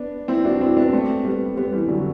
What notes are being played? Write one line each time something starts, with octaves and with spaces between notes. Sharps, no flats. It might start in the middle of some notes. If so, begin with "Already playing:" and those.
Already playing: B3 D4
C4 E4
D4 F#4
C4 E4
B3 D4
A3 C4
G3 B3
G3 B3
E3 G3
D3 F#3